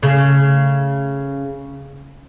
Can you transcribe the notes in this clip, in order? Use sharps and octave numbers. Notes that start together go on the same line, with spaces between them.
C#3 A3